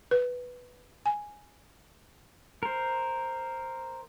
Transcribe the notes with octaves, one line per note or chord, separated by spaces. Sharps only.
B4
G#5
A#4 C5